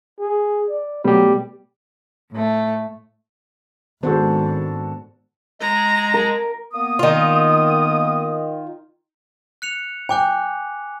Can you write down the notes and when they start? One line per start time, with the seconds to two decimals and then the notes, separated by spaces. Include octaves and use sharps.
0.20 G#4
0.69 D5
1.04 B2 F#3 G3 A3 B3 G4
2.33 A2 A3
4.03 G#1 G#2 D#3 B3 D4 F#4 A4 C5
5.61 G#3 A#5
6.14 A#4
6.73 A#3 B3 D#6
6.99 D#3 F4
9.62 F#6 C#7 F7
10.09 G5 G#5 D6 F#6